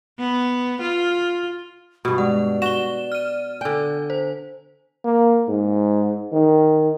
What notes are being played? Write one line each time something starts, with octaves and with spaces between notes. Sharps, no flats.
B3
F4
G2 B2 B5
G#3 D5 F#5
F#4 E7 G7
F6 D#7
D3 G5 G#5
C5
A#3
G#2
D#3